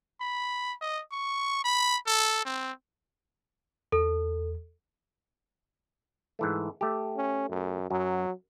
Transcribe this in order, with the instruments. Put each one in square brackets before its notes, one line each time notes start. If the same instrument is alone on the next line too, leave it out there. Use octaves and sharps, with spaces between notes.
[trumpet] B5
D#5
C#6
B5
A4
C4
[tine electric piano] E2 [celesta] A4
[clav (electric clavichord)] G#2 E3 A3
A3 G4
[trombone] C#4
F#2
[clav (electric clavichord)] F#2 [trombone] F#3